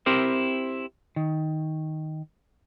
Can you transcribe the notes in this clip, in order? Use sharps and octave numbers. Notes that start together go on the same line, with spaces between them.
C4 E4 G4 A#4 C5
D#3